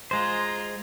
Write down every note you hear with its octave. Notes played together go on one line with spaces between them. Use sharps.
G#3 F4 C5 A#5